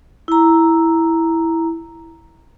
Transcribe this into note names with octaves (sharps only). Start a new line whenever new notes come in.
E4 A#5